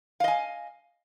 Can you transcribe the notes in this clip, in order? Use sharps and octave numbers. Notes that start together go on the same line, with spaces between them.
D#5 F5 G#5